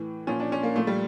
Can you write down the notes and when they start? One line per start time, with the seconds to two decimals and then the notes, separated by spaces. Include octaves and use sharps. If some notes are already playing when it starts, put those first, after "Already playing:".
Already playing: A2 E3
0.27 A#2 F3 C#4
0.40 D4
0.52 C#4
0.63 A#3
0.76 A#2 F3 A3
0.87 G3